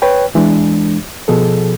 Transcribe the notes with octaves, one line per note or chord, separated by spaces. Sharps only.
B4 C#5 G5
E2 E3 G#3 D4
B2 F3 G#4 A4